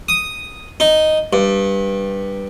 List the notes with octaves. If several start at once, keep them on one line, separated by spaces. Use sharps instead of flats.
D#6
D#4
G2